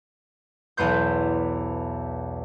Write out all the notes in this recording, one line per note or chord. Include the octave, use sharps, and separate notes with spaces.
B1 E2 B3 C5 G6